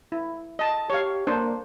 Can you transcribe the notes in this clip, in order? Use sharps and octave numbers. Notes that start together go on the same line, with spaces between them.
E4
D#5 A5
G4 C#5 F5
A#3 D4 C5